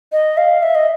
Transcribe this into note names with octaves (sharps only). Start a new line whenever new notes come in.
D#5
F5
E5
D#5